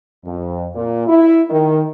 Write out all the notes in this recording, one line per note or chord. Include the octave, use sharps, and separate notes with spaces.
F2
A#2
E4
D#3